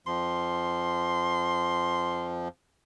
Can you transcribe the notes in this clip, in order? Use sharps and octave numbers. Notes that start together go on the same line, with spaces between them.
F2 F3 C6